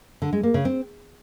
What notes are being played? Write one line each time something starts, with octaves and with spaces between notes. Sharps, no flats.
D3
G#3
A#3
C#3
C4